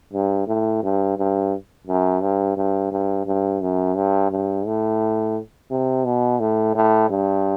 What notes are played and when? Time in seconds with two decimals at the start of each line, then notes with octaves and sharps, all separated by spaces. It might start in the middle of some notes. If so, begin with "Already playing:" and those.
0.13 G2
0.47 A2
0.83 G2
1.17 G2
1.87 F#2
2.22 G2
2.57 G2
2.91 G2
3.26 G2
3.61 F#2
3.96 G2
4.31 G2
4.66 A2
5.71 C3
6.05 B2
6.40 A2
6.75 A2
7.10 G2